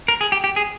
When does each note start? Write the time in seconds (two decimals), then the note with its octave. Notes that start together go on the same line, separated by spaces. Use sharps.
0.08 A#4
0.21 G#4
0.32 G4
0.44 G4
0.56 G#4